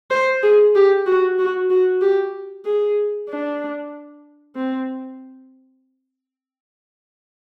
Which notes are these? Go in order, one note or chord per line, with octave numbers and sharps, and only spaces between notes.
C5
G#4
G4
F#4
F#4
F#4
G4
G#4
D4
C4